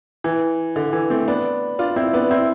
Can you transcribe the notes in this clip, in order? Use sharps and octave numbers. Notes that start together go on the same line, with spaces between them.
E3
D3
E3
A3 C4
B3 D4
D4 F4
C4 E4
B3 D4
C4 E4